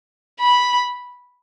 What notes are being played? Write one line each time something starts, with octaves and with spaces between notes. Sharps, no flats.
B5